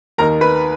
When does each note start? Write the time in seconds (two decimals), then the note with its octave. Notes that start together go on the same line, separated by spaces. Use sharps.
0.18 D#2 D#3 A#3 D#4 A#4 A#5
0.41 B4 B5